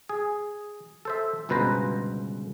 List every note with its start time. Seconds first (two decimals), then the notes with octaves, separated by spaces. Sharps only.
0.09 G#4
1.05 A4 C5 E5
1.49 G1 C#2 B2 B4 C5 A#5